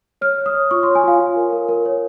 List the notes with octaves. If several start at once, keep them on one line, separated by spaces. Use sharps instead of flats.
C#5 F6
C#5
D#6
C#5
F4 C#6
C#5 C6
G#5
F4 F5
F4
A#4
A#4
A#4
C#5